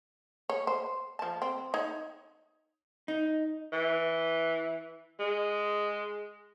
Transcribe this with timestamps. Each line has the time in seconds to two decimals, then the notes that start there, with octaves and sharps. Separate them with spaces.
0.50 C#5
0.67 C5
1.19 F3 A5
1.42 C4
1.74 D#4 C#5
3.08 D#4
3.73 E3
5.19 G#3